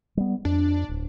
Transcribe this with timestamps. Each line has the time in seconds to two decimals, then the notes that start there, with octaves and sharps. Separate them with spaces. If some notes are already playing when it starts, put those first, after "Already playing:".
0.17 G3 B3
0.45 F2 D4
0.89 D1